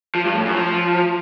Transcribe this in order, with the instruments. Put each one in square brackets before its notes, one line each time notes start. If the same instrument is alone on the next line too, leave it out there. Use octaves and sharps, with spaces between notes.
[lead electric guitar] F3
G2
A2
F#2
F3